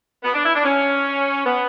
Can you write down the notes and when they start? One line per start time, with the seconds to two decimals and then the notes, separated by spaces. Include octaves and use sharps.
0.24 B3
0.34 D4
0.45 E4
0.54 D4
0.64 C#4
1.45 B3